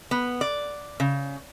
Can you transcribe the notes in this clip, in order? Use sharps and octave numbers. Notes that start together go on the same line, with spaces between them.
B3
D5
C#3